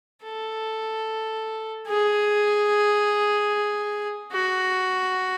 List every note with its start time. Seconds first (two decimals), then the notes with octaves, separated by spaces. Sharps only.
0.24 A4
1.87 G#4
4.31 F#4